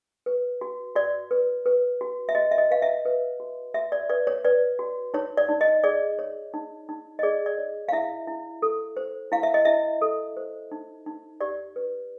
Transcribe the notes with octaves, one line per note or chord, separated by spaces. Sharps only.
B4
F#4
F#4 D5
B4
B4
F#4
E5
F#4 D#5
E5
D#5
B4 F5
E5
B4
F#4
F#4 E5
D5
B4 D5
C#5
B4 D5
F#4
D#4 C#5
D5
D#4
D#5
G#4 D5
C#5
D#4
D#4
D#5
G#4 D5
D5
C#5
F5
E4 E5
E4
A4
C5
E4 F5
E5
D#5
E4 E5
A4
C5
D#4
D#4
G4 D5
B4